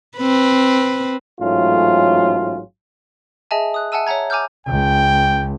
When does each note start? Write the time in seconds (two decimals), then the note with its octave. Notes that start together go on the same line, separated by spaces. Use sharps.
0.18 C4 B4
1.40 A1 G#2 F#3 A3 C#4 F4
3.51 G#4 D#5 E5 G#5 A5
3.74 D#6 F#6
3.92 E5 F#5 G#5 A5 E6 D#7
4.07 C#5 E5 F#5 A#5 G#6
4.30 G#5 A#5 D6 E6 F6 G6
4.67 C#2 G5